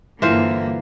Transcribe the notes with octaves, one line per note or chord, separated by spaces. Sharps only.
G2 D3 E3 A#3 F4 C5